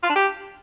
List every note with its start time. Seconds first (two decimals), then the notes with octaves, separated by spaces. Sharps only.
0.03 F4
0.09 D4
0.15 G4